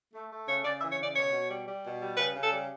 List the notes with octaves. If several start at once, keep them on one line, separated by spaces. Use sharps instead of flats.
A3
A3
C#3 C#5
C#3 D5
E5
E3
C#5
C#3 D5
B2 C#5
B2
G3
G3
B2
G3
C#3 B4
C#3
A4
G3